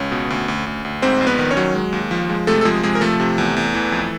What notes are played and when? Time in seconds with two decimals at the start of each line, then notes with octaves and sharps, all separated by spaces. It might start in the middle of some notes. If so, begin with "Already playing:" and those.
Already playing: C#2 C#4 C#5
0.12 B2
0.30 D2
0.48 D2
0.66 D2
0.85 D2
1.02 G#2 C4 C5
1.21 A#1
1.27 B3 B4
1.39 D#3
1.51 C#4 C#5
1.57 F#3
1.75 G#3
1.93 D#2
2.11 F3
2.30 G#3
2.47 C3 A3 A4
2.61 A4
2.65 F3 G#3 G#4
2.83 C3 G#3 G#4
2.95 A#4
3.01 F3 A3 A4
3.20 C3
3.38 E2
3.56 E2
3.74 E3
3.92 F2